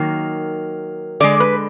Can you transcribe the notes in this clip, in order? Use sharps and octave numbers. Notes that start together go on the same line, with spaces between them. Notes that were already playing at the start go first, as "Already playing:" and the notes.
Already playing: D#3 F#3 A#3
D3 G#3 D5
B4